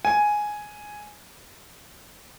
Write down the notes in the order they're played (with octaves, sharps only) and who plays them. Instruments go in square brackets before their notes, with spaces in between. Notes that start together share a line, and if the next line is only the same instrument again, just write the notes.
[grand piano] G#5